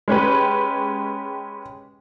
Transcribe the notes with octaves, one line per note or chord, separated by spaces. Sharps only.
G#3 C#4 G4 B4